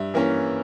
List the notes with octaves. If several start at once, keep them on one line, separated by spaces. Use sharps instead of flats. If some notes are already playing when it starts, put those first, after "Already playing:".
Already playing: G2 E5
E3 A#3 C#4